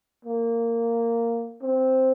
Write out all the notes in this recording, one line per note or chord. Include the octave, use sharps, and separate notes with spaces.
A#3
C4